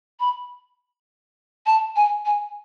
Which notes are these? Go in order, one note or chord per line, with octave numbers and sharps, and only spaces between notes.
B5
A5
G#5
G#5